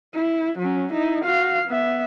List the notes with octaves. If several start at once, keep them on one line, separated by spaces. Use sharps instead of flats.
E4
F#3 C#4
D#4 E4
F#4 F5
B3 E5